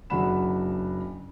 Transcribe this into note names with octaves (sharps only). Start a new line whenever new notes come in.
F#1 F#3 D4 F#5 B5 E7